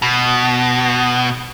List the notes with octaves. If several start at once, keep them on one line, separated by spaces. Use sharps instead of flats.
B2